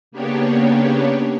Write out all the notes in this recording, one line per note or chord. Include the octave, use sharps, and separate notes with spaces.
C#3 A#3 B3 D4 G4 C#5